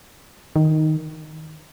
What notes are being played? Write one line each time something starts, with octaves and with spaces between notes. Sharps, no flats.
D#3